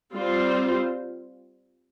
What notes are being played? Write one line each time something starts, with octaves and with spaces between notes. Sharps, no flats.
G3 C4 F4 C5